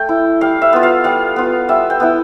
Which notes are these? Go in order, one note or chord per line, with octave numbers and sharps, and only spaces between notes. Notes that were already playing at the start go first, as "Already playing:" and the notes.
Already playing: A3 G5
E4
G3 F5
E5
B3 F4
F5
G3 F5
B3 F4
G3 E5
G5
B3 E4